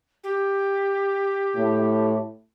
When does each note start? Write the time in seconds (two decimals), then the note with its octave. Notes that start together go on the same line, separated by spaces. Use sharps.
0.23 G4
1.56 A2